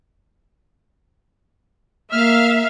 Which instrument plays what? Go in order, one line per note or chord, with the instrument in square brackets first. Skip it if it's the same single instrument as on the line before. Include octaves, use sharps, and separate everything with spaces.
[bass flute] A#3 [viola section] E5 F5 [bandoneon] F6